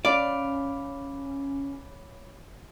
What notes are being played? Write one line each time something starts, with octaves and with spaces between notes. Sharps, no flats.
C#4 C#5 D5 F5 B5 D6